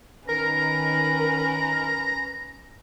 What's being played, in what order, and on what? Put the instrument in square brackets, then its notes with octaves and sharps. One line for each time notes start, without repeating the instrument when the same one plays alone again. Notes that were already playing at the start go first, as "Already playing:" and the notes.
[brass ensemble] D#3 [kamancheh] C#4 B4 [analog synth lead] A#4 [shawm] A#5